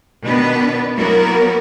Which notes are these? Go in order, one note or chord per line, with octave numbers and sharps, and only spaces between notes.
B2 D#3 B3 D4 B4
F#3 A#3 B3 E4 F#4 A#4